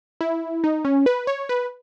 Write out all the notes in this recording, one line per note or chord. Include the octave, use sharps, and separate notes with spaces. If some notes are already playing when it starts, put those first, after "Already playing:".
E4
D#4
C#4
B4
C#5
B4